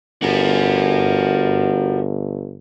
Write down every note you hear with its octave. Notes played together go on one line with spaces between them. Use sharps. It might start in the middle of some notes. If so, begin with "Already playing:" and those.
G1 F#4 A#4